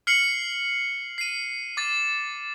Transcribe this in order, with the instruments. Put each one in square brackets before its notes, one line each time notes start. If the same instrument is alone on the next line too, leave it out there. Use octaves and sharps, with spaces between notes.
[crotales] F6 C7 C#7 F#7
C7 D#7
D6 A6